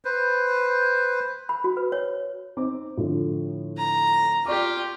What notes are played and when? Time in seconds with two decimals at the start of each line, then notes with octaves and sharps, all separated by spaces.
0.05 B4 C5
1.49 B5
1.64 F#4
1.77 B4
1.92 C#5
2.57 C4 D#4 D6
2.97 A2 D3 F3
3.77 A#5
4.46 F4 G4 D5 C#6 D6